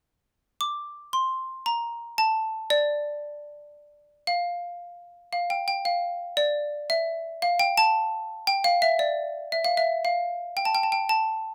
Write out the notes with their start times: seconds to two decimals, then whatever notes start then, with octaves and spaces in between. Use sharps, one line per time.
0.61 D6
1.13 C6
1.66 A#5
2.18 A5
2.70 D5
4.27 F5
5.33 F5
5.50 G5
5.68 G5
5.85 F5
6.37 D5
6.90 E5
7.42 F5
7.59 G5
7.77 A5
8.47 G5
8.64 F5
8.82 E5
8.99 D5
9.52 E5
9.65 F5
9.77 E5
10.05 F5
10.57 G5
10.65 A5
10.75 G5
10.83 A5
10.92 G5
11.09 A5